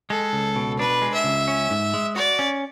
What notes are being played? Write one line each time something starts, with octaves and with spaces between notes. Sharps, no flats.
G#3 A4
C#2
B2
D4 B4
G#3
E5
C#2
C#4
G#2
G#3
F#4 D5
C#4